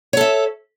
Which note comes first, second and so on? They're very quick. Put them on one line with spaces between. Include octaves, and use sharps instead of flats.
C#5 A4 E5